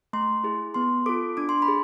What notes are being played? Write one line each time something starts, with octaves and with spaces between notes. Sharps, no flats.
A3 C6
E4 G#4
B3 C6
F4 A4 D6
D4 D6
C6
B5
G#4